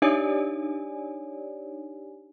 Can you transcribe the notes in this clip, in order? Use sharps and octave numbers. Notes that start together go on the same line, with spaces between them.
D4 D#4 G4 C#5 D5 G#5